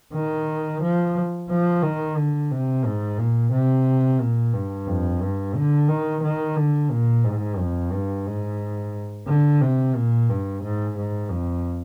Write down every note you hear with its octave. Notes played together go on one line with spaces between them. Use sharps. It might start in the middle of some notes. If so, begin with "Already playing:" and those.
D#3
F3
F3
D#3
D3
C3
G#2
A#2
C3
A#2
G2
F2
G2
D3
D#3
D#3
D3
A#2
G#2
F2
G2
G#2
D3
C3
A#2
G2
G#2
G#2
F2